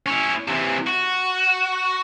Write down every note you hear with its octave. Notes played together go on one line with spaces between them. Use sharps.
C#4 E4
C3 E3
F#4